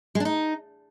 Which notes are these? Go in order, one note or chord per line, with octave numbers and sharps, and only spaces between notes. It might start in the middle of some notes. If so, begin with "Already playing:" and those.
G#3
D4
D#4